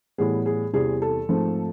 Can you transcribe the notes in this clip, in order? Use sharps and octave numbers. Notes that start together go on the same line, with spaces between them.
A2 E3 G3 B3 G#4
G#4
E2 C3 E3 G3 C4 G#4
A4
G#2 F3 A3 C4